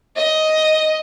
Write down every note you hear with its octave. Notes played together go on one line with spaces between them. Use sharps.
D#5